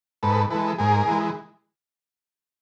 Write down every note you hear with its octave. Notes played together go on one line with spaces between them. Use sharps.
G#2 A4 B4
E3 G#3 A4 B4
G#2 G#4 A#4
E3 G#3